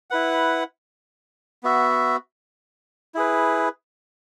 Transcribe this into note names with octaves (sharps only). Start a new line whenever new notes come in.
E4 B4 F#5
B3 F#4 E5
E4 G#4 B4